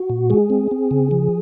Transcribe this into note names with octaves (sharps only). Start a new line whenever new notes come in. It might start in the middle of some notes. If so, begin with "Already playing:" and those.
Already playing: F#4
A#2
G#3 G#4
C4
C4
C#3
F3